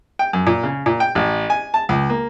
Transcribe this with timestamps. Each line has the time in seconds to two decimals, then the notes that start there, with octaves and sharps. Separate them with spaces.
0.19 G5
0.33 F#2
0.47 A#2
0.63 C#3
0.86 A#2
1.00 G5
1.15 A1
1.50 G#5
1.74 A5
1.89 C#2
2.10 A#3